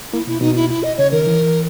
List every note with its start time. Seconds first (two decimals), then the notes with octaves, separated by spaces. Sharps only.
0.12 A#3 E4
0.27 B2 E4
0.41 B2 D#4
0.56 E4
0.70 E4
0.83 D#5
0.98 C#3 C#5
1.12 D#3 A#4
1.27 E3